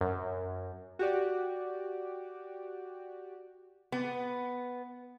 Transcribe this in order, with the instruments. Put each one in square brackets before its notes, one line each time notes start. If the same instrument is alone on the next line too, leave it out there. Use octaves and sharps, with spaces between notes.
[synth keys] F#2
F#4 G4 D5
[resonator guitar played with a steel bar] B3